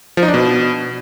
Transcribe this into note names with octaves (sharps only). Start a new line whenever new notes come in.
F3
D#4
D4
B2